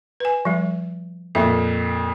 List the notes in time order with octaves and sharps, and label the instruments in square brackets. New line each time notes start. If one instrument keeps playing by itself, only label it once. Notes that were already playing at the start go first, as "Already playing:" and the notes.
[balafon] B4 G#5
F3 G3
[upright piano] F2 A#2 [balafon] E5